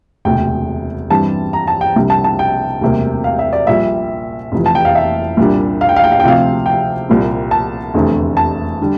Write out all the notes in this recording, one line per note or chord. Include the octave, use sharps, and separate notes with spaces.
E1 D2 C3 G5
G2 E3 G3 C4 A5
A#5
A5
G5
C2 C3 G3 D4
A5
A5
G5
E1 D2 C3 G3 A#3
F5
E5
D5
A#1 A#2 G3 E5
F1 F2 E3
A5
G5
F5
E5
C2 A#2 G3 D4
F5
G5
F5
G5
F5
G5
D2 C3 F3 C4 F5
G5
C2 A#2 G3 C4
A5
F1 E2 D3 A3 C4
A5
D3 G3